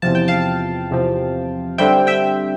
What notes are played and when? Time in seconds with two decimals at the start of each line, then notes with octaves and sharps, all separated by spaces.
0.02 E2 C3 F3 A5
0.15 G5
0.28 F5 A5
0.90 E2 C3 F3
1.78 D3 G3 C4 E5 G5
2.07 E5 G5